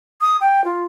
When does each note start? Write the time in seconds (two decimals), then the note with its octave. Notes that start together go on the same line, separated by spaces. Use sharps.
0.21 D#6
0.41 G5
0.64 F4